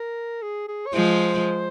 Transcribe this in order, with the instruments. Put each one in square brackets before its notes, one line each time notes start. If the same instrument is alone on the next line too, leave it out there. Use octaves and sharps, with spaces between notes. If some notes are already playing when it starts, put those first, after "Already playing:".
Already playing: [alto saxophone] A#4
G#4
G#4
C#5
[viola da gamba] F3 G#3 [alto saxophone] C5